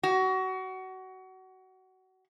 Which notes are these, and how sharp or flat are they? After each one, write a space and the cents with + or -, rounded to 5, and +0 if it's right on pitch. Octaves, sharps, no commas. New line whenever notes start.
F#4 +25